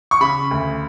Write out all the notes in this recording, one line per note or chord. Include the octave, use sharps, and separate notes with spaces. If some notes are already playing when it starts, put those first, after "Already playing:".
C#6
C#3 B5
D2